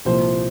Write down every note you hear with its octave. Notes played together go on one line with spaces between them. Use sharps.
C2 A#2 F3 C5